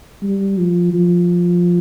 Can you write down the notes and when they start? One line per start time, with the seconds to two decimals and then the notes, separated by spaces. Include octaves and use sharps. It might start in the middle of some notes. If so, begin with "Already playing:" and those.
0.23 G3
0.58 F3
0.93 F3